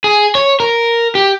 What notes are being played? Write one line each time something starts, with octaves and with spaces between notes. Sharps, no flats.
G#4
C#5
A#4
G4